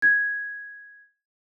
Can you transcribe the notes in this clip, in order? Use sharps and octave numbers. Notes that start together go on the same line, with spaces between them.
G#6